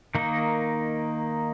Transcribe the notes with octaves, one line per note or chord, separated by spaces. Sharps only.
D#3 A#3 D#4